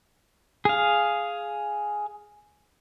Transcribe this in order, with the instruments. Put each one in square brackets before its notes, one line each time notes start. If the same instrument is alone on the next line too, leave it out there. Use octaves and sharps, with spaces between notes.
[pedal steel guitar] G#4 F5